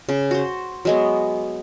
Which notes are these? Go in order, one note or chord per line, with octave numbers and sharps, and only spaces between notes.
C#3
F#4 C5
F#3 G#3 B3